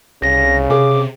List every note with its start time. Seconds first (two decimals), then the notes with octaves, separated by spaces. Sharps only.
0.22 C2 C#3 A#6
0.70 C3 G#4 D6